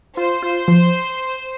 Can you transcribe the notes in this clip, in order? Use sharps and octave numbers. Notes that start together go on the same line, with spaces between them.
F4 C5
F4
F3